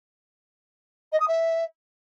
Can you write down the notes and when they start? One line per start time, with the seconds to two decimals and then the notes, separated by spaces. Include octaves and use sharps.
1.12 D#5
1.20 D#6
1.28 E5